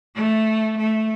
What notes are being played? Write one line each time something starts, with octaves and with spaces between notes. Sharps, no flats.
A3
A3